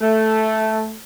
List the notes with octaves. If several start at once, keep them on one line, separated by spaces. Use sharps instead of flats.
A3